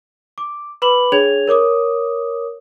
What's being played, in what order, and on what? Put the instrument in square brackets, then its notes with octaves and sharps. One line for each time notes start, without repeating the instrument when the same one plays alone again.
[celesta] D6
B4 B5 D6 F#7
D4 G#4 C#5 G#6 F7
A#4 C#5 D6 D#6